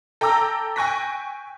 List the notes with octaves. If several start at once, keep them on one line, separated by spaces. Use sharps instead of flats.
A4 G5 A#5 D6 E6
G5 G#5 C#6 F#6 A#6 B6